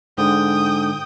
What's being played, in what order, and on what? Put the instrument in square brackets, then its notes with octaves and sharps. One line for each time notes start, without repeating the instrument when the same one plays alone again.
[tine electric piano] G#2 D3 [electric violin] G5 D#6